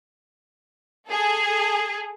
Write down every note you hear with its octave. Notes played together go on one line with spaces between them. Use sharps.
G#4 A4